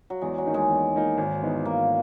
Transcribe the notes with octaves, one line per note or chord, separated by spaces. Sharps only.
F#3
E2 G#3
F#3
D#3 A#3 D#4
G#3
E2
D#3 A#3 D#4
G#1
G#2 E3 B3 D#4
G#1 A#3